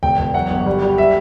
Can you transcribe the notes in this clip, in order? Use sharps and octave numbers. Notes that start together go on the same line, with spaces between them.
E1 G5
E1
F#3 F#5
G1
G3
G3
E5